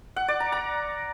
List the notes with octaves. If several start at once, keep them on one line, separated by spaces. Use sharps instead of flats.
F#5
D5
A#5
A#5